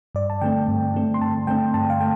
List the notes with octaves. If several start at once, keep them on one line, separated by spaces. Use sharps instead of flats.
G2 D5
A5
D3 A3 C4 G5
G2
D3 A3 C4
C6
G2 A5
D3 A3 C4 G5
G2 A5
F5
A3 G5